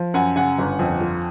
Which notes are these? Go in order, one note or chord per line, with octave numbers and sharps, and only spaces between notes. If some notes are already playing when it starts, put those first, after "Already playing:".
Already playing: F3
F#2 F#5 G#5
C#3 F#5 G#5
G1
F2
F3